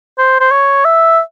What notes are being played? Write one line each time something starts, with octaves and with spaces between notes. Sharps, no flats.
C5
C5
C#5
E5